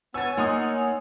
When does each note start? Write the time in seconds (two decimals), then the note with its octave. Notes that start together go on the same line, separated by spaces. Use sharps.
0.14 B3 C#5 G#5 E6 A6
0.37 A#3 D#4 F#5 C6 D#6 F6